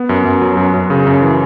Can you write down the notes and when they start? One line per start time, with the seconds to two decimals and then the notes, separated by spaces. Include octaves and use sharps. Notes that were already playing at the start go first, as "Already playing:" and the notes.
Already playing: B3
0.09 F#2
0.25 F#2
0.41 F#3
0.57 F#2
0.74 F#2
0.90 C#3
1.07 F#2
1.22 E3